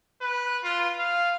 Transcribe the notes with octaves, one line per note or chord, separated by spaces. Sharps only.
B4
F4
F5